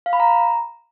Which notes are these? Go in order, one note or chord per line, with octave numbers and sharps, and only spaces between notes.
F5
B5
A#5